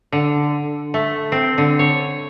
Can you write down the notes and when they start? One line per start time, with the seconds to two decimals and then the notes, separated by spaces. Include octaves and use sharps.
0.12 D3
0.94 A3
1.32 C4
1.58 D3
1.79 C#5